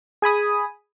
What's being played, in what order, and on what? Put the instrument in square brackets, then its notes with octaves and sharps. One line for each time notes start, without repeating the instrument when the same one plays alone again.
[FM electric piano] G#4 G#5 B5 D#6